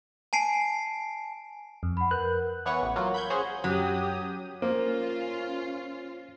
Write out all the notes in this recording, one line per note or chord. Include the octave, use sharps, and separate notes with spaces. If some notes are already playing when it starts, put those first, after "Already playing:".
G#5 A5 C7 D7
F2
F#5 B5
A#4 B4 F#6 G6
E3 B3 B4 C#5 F#5 C#6
A1
F#3 A#3 F4 F#4
B5 G6 G#6
C#4 F#4 G#4 C5
F#2 F#3 G4 D#6
A#3 C#4 F4 C5